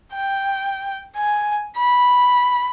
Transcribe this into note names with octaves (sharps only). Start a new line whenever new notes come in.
G5
G#5
B5